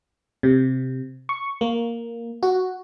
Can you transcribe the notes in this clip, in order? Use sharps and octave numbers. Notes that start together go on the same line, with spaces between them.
C3
C#6
A#3
F#4